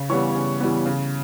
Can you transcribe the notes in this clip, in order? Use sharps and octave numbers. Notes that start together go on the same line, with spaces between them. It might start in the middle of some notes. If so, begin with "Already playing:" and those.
Already playing: C#3
E3 G3 B3 C#5 C#6
C#3
E3 G3 B3
C#3